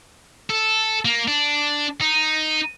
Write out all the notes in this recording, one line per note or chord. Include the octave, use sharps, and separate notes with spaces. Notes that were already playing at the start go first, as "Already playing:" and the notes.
A4
A#3
D4
D#4